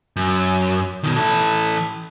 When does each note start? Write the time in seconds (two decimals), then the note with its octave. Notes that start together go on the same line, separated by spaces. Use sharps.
0.16 F#2
1.03 B2 D#3
1.16 E3 A4